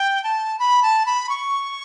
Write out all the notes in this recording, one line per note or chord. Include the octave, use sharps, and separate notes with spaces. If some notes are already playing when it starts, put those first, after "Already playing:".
Already playing: G5
A5
B5
A5
B5
C#6